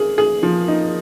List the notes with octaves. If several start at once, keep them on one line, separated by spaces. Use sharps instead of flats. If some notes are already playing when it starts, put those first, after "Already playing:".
Already playing: A#3 G#4
G#4
F3
D#4